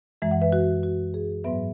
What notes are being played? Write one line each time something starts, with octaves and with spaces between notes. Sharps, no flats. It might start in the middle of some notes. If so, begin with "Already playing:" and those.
F#2 E3 G#3 E5
F#5
B4 E5
F#4
F#4
G#4
G#2 F#3 B3 B4 E5